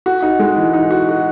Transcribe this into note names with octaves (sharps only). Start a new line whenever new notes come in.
F#4
D#4
G#3
E3
D#4
F#4
F#4